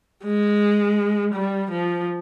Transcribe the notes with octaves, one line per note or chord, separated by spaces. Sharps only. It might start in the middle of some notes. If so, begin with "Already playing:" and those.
G#3
G3
F3